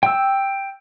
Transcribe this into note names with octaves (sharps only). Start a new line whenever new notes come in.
G5 E6